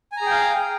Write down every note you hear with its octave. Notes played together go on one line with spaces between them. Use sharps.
G#4 F5 G5 G#5 A#5